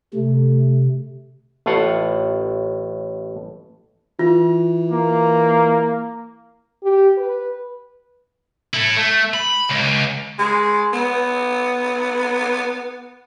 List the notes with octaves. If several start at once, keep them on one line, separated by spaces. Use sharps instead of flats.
C3 A3
A1 A2 F4 F#5
E3 F4
A#3
G4
B4
E4 A4
A3
B5
C#2
G#3
B3